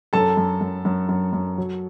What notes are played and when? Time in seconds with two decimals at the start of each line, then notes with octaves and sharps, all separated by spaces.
0.13 F#2 A4 A5
0.37 F#2
0.61 F#2
0.85 F#2
1.09 F#2
1.33 F#2
1.58 F#3